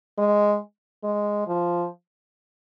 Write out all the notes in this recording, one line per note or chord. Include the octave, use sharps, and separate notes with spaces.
G#3
G#3
F3